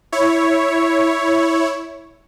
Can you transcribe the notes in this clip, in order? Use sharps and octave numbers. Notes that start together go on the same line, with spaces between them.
E4 C#5